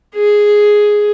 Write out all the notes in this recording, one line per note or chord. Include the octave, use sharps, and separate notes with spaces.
G#4